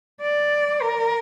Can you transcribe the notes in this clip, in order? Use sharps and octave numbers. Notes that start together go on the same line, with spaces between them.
D5
A#4